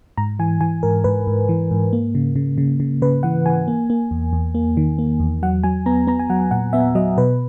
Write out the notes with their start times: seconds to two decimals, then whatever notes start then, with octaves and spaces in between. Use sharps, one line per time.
0.18 G#2 A#5
0.39 E3 G#5
0.61 E3 G#5
0.83 G#2 A#4
1.04 G#2 B4
1.27 G#2
1.49 E3
1.71 G#2
1.93 A#3
2.15 C#3
2.36 C#3
2.58 C#3
2.80 C#3
3.02 C#3 B4
3.23 E3 F#5
3.46 E3 G#5
3.68 A#3
3.90 A#3
4.11 E2
4.33 E2
4.55 A#3
4.77 D#3
4.98 A#3
5.20 E2
5.42 F#3 F#5
5.64 F#3 G#5
5.86 B3 A#5
6.07 B3 A#5
6.19 G#5
6.30 F#3 F#5
6.51 A#2 F#5
6.73 B3 E5
6.95 F#3 D#5
7.17 B2 B4